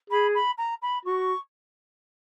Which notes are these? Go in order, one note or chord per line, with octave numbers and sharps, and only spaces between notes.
G#4 B5
B5
A#5
B5
F#4 C#6